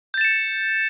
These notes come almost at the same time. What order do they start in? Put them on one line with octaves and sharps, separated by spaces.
G6 A6 E7 C#7